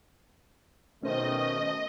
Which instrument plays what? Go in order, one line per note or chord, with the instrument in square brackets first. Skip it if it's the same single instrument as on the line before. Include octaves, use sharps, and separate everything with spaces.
[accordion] B2 D#3 A3 [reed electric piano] C#4 C5 [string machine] D#5